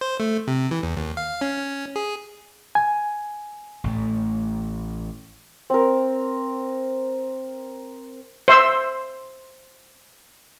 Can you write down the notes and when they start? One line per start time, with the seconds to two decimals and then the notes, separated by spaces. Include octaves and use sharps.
0.01 C5
0.20 A3
0.47 C3
0.71 E3
0.83 E2
0.96 D#2
1.17 F5
1.41 C#4
1.57 C#4
1.96 G#4
2.75 G#5
3.84 A1 A2 A3
5.70 C4 A#4
8.48 C5 E5 C6 E6